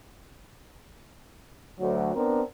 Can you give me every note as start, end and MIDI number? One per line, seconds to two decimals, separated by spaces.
1.79 2.15 38
1.79 2.15 54
2.15 2.42 59
2.15 2.42 60
2.15 2.42 62
2.15 2.42 70